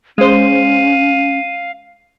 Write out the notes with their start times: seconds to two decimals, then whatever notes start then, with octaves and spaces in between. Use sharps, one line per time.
0.18 G#3 C#4 C5 F5 D#7